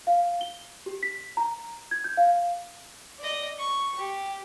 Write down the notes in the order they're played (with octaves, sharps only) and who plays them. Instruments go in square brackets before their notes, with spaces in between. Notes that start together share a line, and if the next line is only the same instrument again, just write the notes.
[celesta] F5
G7
G4
B6
A#5
G#6
G6
F5
[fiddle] D5 D#5
C#6
G4